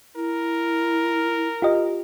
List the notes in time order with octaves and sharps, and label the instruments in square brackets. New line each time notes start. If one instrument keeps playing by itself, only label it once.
[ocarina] E4 [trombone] A#4
[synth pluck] F4 G4 D#5